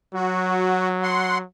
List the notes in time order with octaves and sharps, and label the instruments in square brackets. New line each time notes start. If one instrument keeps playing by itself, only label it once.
[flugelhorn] F#3 [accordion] F#4
[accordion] F#5 C6